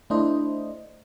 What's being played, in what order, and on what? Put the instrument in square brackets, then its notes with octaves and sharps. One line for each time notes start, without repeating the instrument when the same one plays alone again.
[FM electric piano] A3 D4 E4 C5 D#5